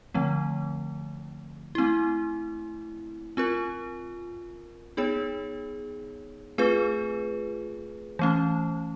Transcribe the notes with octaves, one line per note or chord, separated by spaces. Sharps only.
D3 F3 A3 C4
A3 C4 E4
C4 F4 A#4
B3 D#4 G#4 C#5
A3 C4 F4 G#4 B4
E3 A3 C#4